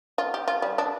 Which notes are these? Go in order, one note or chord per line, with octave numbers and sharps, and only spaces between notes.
F4
G4
F4
G3
D4